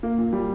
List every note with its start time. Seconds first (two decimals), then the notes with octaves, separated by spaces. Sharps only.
0.03 A#3
0.18 A#2
0.33 G3